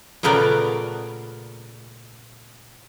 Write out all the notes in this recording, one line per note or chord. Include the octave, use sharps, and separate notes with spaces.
A#2 C#3 A3 B3 A#4 D5